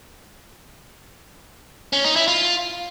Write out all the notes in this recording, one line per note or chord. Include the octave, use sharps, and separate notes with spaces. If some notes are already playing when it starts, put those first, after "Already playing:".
C#4
D#4
E4
F4